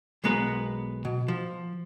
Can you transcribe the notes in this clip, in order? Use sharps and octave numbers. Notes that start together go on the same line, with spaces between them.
B1 G#3 B3 A#4 B4
B2
F3